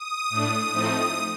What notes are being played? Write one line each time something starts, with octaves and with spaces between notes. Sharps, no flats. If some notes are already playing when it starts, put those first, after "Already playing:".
Already playing: D#6
A2 A3 D4
A2 F3 A3 C4 D#4